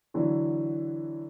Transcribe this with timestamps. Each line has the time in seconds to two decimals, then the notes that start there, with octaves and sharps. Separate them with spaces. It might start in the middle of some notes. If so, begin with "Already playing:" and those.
0.14 D3 E3 F#3